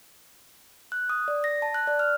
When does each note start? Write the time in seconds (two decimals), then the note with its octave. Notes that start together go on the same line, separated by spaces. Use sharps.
0.92 F#6
1.09 D#6
1.28 D5
1.44 A#6
1.62 A5
1.74 F#6
1.87 D5
1.99 F6